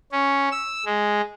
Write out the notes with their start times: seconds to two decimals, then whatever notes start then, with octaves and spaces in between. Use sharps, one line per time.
0.12 C#4
0.52 E6
0.85 G#3